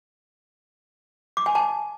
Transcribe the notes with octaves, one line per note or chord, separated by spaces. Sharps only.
D6
G#5
A5